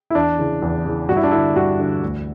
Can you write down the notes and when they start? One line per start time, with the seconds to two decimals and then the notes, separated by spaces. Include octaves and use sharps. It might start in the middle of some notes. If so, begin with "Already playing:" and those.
0.10 E4
0.15 E2 D4
0.38 C#3 E3
0.62 E2
0.85 C#3 E3
1.09 G2 F#4
1.16 E4
1.24 D4
1.31 D3 E4
1.56 G2 F#4
1.79 D3
2.02 D2